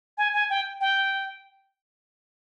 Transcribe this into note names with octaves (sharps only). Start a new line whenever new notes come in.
G#5
G#5
G5
G5